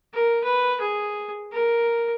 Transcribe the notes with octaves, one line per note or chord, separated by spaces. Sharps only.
A#4
B4
G#4
A#4